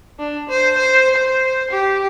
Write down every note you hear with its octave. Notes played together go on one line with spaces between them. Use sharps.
D4
C5
C5
C5
G4